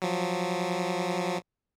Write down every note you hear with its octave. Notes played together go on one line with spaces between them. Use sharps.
F3 F#3